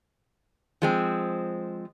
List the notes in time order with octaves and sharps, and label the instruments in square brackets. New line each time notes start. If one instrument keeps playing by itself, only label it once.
[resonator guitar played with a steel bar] F3 G#3 C4